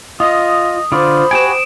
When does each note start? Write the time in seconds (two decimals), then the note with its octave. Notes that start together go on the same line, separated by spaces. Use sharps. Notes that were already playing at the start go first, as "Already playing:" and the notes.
0.20 F4 D#5 D#6
0.92 D3 F4 C5 D5 B5
1.31 F#4 G4 G#5 D7 E7